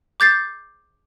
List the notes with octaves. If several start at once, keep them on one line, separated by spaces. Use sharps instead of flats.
D6 G6 A6 C7